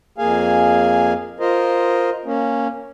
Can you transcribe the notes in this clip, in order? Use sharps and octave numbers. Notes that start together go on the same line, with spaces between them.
F2 A#3 G#4 F5 G#5
F4 A#4 C5 D#5
A#3 C#4